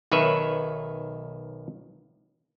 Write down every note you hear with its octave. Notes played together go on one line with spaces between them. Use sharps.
B1 D#3 B4 C#5 E5